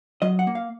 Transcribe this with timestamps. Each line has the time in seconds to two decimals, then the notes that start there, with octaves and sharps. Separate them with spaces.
0.22 F#3 D#5
0.39 F#5
0.47 A#3
0.55 F5